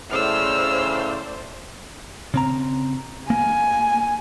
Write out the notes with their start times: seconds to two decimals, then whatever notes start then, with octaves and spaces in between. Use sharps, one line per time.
0.10 A2 C#3 C5 D5 E6 F6
2.34 C#3 C4 A#5
3.30 A#3 G#5